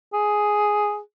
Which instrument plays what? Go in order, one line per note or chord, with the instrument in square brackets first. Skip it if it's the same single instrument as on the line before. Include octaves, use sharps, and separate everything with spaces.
[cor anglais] G#4